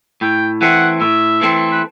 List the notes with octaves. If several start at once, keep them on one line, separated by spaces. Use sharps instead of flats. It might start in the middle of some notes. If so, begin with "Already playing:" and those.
A2 G5
E3 A3 C4 F#5
A2 E5
E3 A3 C4
B4